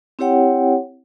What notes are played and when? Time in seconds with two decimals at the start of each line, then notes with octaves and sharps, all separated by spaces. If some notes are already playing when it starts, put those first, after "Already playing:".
0.19 C4 E4 G4 C#5 F#5 G5